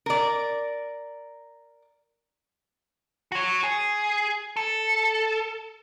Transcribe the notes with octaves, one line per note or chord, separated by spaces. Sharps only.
A#4 D5
F#4 C#5
G#4
A4